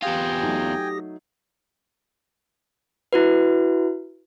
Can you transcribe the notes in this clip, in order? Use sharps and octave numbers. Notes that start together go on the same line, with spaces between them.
E2 F4 G4 G5 G#5 D#6 A#6
F#3 A3 D#4
E4 F#4 B4